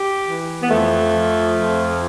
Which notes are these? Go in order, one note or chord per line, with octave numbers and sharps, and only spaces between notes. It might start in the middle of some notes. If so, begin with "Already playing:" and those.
Already playing: G4
E3
B3
F2 A3
F3
F2